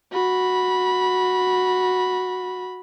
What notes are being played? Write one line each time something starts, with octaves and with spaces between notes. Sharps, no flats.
F#4 B5